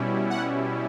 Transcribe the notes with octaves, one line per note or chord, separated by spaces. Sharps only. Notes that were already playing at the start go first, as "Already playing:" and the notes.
Already playing: B2 G3 C#4 E4
F#5